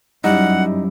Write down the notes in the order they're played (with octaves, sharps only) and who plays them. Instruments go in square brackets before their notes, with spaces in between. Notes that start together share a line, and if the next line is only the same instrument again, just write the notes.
[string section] F#2 [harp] G3 E4 [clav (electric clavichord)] D#4 [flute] F#5